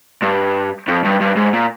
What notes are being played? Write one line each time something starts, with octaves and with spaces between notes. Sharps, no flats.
G2
F2
G2
G2
G#2
A#2